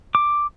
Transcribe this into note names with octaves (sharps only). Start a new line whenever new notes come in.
D6